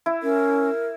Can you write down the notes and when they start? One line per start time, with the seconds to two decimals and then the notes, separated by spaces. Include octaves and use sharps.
0.06 E4
0.23 C#4 A#4